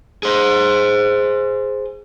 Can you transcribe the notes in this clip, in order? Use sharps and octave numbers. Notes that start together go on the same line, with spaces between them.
G#4 C5